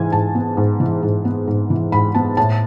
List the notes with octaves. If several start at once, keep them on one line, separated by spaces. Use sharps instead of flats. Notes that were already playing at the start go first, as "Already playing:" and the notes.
Already playing: G#2 E3 G#5
G#2 A5
B3
G#2
E3
G#2
B3
G#2
E3
G#2 B5
B3 A5
A2 A5